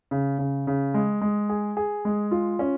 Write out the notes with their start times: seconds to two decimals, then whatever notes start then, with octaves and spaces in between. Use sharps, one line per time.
0.11 C#3
0.39 C#3
0.67 C#3
0.94 G#3
1.21 G#3
1.49 G#4
1.77 G#4
2.05 G#3
2.31 F4
2.59 C#4